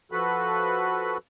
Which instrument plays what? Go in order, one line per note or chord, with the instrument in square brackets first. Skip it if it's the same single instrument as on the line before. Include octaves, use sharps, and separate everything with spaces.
[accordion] F3 F#4 A4 B4 B5